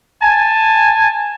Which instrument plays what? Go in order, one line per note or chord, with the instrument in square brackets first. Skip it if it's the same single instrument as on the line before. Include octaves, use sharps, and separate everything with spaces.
[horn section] G#5 A5